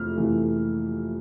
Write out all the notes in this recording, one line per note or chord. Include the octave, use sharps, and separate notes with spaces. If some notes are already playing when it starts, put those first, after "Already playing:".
Already playing: F2 C3 E3 A3 F6
F2 C3 E3 A3